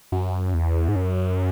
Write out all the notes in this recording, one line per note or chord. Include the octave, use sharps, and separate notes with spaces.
F#2
E2
G#2
F#2